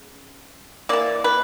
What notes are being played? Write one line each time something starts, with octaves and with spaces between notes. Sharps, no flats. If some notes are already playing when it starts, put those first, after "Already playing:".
Already playing: C#3
E3 A#3 D5
B4